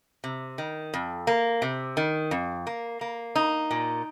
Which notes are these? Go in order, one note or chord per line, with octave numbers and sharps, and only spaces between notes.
C3
D#3
F2
A#3
C3
D#3
F2
A#3
A#3
D#4
A#2